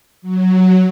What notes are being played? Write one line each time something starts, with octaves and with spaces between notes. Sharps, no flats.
F#3